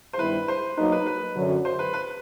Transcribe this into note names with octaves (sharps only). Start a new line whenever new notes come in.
C5
G2 D#3 G3 B3 E4 B4
C5
F#3 A#3 D#4 B4
B4
B4
F#2 D3 F#3
C5
B4
B4